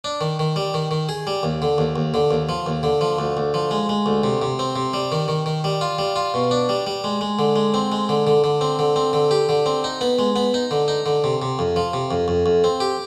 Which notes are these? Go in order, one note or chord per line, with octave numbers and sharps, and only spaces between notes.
D4
D#3
D#3
G3
D#3
D#3
G#4
G3
D#2
D3
D#2
D#2
D3
D#2
F3
D#2
D3
F3
D2
D2
F3
G#3
G#3
D2
C3
C3
C4
C3
G3
D#3
D#3
D#3
G3
F4
G3
F4
B2
D4
G3
G3
G#3
G#3
D3
G#3
C4
G#3
D3
D3
D3
C4
D3
C4
D3
G4
D3
C4
D#4
B3
G#3
B3
D#4
D3
D#4
D3
C3
C3
F2
F3
C3
F2
F2
F2
C4
G4